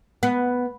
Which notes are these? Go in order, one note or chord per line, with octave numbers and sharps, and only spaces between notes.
B3